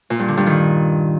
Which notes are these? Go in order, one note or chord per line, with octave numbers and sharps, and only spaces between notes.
A#2
G2
D3
G2
D#3